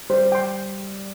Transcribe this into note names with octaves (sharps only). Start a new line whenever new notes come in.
G3 C5
G5 C6